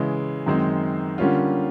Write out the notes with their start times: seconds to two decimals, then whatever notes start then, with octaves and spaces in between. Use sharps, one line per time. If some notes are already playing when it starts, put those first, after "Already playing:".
Already playing: C#3 E3 G#3
0.47 F#2 D#3 G#3 C4
1.18 D3 G3 A#3 C#4 F4